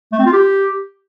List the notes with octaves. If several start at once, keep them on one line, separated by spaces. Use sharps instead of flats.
A3
C4
F4
G4